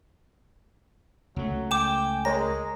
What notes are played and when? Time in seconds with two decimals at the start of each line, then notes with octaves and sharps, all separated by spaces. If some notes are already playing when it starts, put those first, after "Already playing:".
1.36 C#2 F#3 A3
1.71 G5 G#5 D6 E7
2.25 G#3 A#4 C#5 A#5 A#6